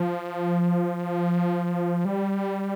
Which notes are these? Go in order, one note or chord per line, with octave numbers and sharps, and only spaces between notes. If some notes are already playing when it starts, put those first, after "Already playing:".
Already playing: F3
G3